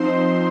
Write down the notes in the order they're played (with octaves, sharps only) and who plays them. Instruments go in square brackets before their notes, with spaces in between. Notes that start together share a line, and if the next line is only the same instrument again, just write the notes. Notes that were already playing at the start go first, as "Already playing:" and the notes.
Already playing: [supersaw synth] F3 C4 D#4 C5 C6